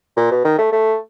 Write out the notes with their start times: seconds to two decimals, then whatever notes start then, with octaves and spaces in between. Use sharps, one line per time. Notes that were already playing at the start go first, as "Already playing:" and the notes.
0.17 A#2
0.31 B2
0.44 D#3
0.58 A3
0.72 A3